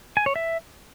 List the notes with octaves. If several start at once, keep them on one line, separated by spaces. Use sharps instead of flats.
G#5
C#5
E5